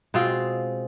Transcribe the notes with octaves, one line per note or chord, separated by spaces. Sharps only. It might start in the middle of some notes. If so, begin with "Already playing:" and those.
B2 G#3 C4 F4